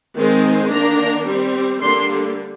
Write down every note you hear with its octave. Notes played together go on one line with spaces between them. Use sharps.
D#3 G#3 C4
D#3 A#3 D4 A#5
G3 C4
D3 G3 A#3 D4 C6